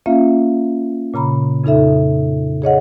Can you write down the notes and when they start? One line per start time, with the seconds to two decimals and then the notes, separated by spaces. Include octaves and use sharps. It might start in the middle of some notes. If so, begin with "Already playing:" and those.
0.06 A#3 C#4 F4 E5 F5
1.14 A#2 C#3 A#5 B5
1.64 F2 C#3 D#4 A4 E5
2.62 G#4 C#5 D#5 F#5